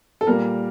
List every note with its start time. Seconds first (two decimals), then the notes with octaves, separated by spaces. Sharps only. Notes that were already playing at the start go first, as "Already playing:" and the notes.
0.21 A4
0.27 A#2 G3 A#3 A#4